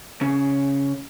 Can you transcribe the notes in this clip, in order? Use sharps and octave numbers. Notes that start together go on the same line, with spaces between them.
C#3 C#4